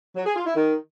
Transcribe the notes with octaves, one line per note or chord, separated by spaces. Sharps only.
F#3
G#4
F4
E4
D#3